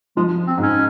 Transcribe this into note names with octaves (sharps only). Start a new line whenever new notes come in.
F3 G#3
C4
G#2
C#4